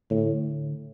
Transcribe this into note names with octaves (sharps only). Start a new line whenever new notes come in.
A2 D3